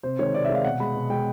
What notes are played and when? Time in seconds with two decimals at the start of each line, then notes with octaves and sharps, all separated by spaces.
0.03 C3 C5
0.19 D#3 G#3 C#5
0.34 C3 D5
0.45 E5
0.50 D#3 G#3 F5
0.64 B2 F#5
0.80 G#3 B5
0.95 B2
1.10 G#3 G5